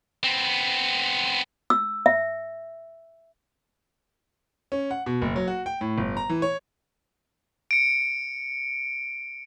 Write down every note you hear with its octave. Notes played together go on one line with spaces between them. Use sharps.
B3 C4
E6
E5
C#4
F#5
B2
F#1
F#3
F#4
G5
A2
G1
A#5
E3
C#5
C#7 D7